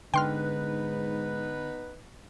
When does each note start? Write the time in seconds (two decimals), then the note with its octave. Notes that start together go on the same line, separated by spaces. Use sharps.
0.14 G#2 D3 B3 D#4 B4 G5 C6 F6